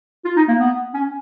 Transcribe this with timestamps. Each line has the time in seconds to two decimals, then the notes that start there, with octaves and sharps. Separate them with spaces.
0.25 F4
0.36 D#4
0.48 A#3
0.60 B3
0.94 C#4